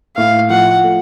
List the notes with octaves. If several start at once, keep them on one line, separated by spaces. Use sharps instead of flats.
A2 F5
F3 F#5
A3